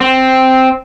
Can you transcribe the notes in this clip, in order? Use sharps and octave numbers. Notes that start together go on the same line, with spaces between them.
C4